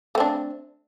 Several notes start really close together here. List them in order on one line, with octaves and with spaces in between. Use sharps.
A3 C4 D4